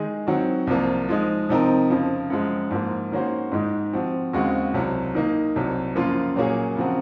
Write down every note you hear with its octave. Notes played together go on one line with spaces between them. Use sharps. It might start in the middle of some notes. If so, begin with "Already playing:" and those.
Already playing: D#3 G#3 D#4 G#4
D#3 F#3 C4 F#4
C2 C3 F3 A#3
F3 G#3 D#4
C3 F3 C4 D#4 A#4
F2 C#3 F3
F#2 F3 G#3
G#2 F3 A#3
D#3 A#3 C#4 F#4 C5
G#2 D#3 G#3 D#4
F3 C4 F#4
D#2 C#3 G#3 C4 F#4
C2 C3 F#3
D#3 A#3 D#4
C2 C3 F#3
F#2 C#3 F3 A#3 F4
A#2 F#3 A#3 C#4 G#4
C#3 F3 C4 F#4 A#4